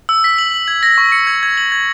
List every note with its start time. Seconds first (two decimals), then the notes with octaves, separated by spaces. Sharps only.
0.09 E6
0.24 B6
0.38 F#7
0.54 F#7
0.68 G#6
0.83 A#6
0.98 C#6
1.12 C#7
1.27 G#6
1.43 G#6
1.57 F#7
1.72 G#6